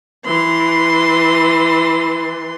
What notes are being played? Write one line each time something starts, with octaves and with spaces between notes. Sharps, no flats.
E3 C6